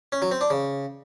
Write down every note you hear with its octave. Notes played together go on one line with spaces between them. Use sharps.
C#4
F#3
C4
D4
C#3